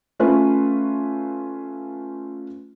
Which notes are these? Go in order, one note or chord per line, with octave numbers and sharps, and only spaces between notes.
A3 C#4 F4 B4